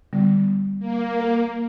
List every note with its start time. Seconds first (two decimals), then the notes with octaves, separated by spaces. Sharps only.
0.13 D3 G3 B3
0.79 A#3
1.20 A#4